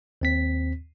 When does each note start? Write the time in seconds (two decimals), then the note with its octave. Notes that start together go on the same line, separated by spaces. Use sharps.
0.21 D#2 C4 B6